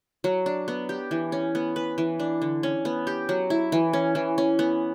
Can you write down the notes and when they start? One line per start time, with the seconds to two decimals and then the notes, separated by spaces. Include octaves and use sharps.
0.24 F#3
0.46 D4
0.68 B3
0.89 G4
1.11 E3
1.32 C#4
1.55 B3
1.76 B4
1.98 E3
2.20 D4
2.42 D3
2.63 C#4
2.85 B3
3.07 G4
3.29 F#3
3.50 E4
3.72 E3
3.93 C#4
4.15 E3
4.38 C#4
4.59 B3